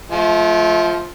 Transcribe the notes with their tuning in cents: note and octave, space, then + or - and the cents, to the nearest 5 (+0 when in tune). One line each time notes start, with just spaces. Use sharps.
F3 +0 A3 -35